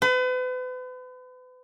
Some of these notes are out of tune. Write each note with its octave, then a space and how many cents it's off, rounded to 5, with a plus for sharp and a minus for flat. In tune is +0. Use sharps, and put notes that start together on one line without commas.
B4 +40